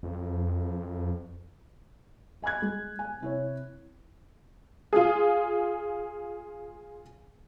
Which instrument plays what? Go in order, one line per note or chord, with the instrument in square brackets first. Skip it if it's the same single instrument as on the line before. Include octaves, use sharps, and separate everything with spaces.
[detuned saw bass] F2
[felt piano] D#5 G#5 B5 F#6 G#6
G#3
G#5
C3 E4 C#5
[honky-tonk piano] F4 G#4